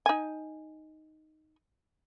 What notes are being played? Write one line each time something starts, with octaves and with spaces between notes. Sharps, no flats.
D#4 G#5